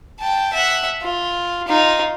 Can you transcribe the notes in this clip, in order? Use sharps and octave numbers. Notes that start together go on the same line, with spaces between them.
G5 A5
E5 F#5
F4
D#4 F4